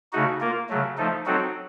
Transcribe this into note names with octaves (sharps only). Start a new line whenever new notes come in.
C#3 A3 D#4 F#4
A#3 F4 A#4
C#3 F#3 A3
F3 A3 D#4 A4
F#3 C4 D#4 F#4 A4